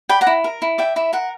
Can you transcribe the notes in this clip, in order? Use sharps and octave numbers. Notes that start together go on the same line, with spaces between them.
D5 G5 B5
F#5 A#5
E4
A#4
E4
D5 E5 G5
E4 E5
A#4 F#5